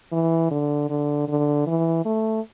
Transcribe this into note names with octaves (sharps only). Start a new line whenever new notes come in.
E3
D3
D3
D3
E3
A3